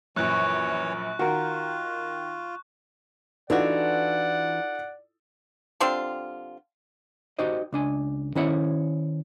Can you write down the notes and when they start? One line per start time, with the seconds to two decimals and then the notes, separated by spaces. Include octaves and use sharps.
0.16 A#1 F#2 E3 C#5 C#6 F#6
1.19 D#3 F4 F#4 A#4
3.50 E3 D4 D#4 F4 F#4 A4 D5 F#5
5.80 D3 G3 C4 F4
7.39 D#4 F#4 G4 C5 D#5
7.72 C#2 D4 G#5
8.35 D#3 C#4 E4 C5 C#5 F#5